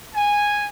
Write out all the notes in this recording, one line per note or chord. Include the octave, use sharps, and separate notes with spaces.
G#5